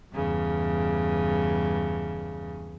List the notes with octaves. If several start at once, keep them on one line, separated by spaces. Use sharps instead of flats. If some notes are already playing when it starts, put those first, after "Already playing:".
E2 G2 C#3